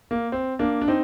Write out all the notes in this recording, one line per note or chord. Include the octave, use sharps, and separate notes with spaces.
A#3
C4
A#3 D4
D4
C4 D#4